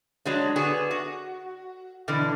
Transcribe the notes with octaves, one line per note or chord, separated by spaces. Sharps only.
F#3 G#3 D4
D3 B3 F#4 G#4
F#4
B2 D3 E3